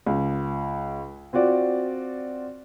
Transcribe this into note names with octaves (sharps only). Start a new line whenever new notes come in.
C#2
C4 F4 F#4 D5